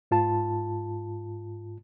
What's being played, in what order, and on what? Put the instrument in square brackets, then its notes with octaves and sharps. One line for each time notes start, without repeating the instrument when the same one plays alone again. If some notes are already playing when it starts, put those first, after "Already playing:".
[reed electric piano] G#2 F4 A5